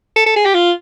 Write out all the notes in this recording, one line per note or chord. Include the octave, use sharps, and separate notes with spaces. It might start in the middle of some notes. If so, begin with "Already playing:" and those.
A4
A4
G#4
G4
F4